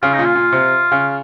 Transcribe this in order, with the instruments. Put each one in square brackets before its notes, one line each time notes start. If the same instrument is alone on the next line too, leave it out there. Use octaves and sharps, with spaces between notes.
[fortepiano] C#3 [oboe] F4
[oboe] D#4
[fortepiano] A#2
[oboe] F4
[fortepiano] A#2
C3
C#3